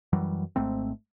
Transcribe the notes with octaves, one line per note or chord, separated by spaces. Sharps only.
F#2 E3 F#3 G3
G#1 G#2 A3 C4